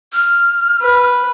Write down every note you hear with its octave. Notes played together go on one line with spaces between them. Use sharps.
F6
B4